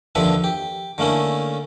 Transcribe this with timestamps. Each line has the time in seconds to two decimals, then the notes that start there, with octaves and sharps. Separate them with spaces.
0.15 D#2 D3 F3 D4 B4 E5
0.44 G4
0.98 D3 A3 A#3 C#4 E4